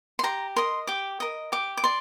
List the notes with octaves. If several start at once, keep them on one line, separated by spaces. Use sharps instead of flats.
C6
G4 A#5
A#4 D#5 C6
G4 D6
A#4 D#5
G4 D6
D6
D5 C6